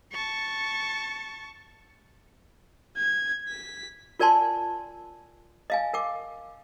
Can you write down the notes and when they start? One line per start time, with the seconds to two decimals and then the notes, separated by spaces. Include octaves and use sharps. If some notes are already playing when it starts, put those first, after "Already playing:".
0.12 A5 C#6
2.97 G#6
3.49 B6
4.19 F4 A#4 D5 G#5 A5 C6
5.70 D#5 F5 G#5
5.93 A#4 G5 D6